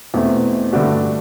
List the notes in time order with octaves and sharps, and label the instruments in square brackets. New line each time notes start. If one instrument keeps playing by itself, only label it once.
[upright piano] E2 B2 A3 C4
G2 D3 A3 D4 F#4